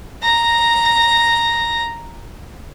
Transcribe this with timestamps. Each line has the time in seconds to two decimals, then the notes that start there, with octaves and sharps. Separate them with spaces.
0.23 A#5 A#6